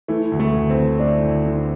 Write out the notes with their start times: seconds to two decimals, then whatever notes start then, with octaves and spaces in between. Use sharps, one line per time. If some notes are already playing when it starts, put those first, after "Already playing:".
0.08 E3 A3
0.32 D2
0.40 A3
0.55 D2
0.70 C4
0.77 D2
1.00 A3 D4
1.23 D2
1.45 D3